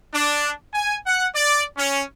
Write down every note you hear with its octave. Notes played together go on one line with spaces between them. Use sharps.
D4
G#5
F#5
D5
C#4